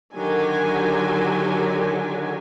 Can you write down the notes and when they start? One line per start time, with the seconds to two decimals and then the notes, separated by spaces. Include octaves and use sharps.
0.15 D3 D#3 F#3 F#4 G4 G#5